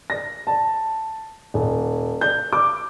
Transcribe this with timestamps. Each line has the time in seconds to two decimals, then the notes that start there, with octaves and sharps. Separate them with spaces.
0.10 A#6
0.47 A5
1.54 D#1
2.21 G6
2.53 D6